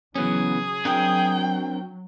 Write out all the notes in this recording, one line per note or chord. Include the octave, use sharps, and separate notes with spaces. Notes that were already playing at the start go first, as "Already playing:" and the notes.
C#3 E3 F#3 B3 C#4 G#4
F#3 C4 D4 A#4 G5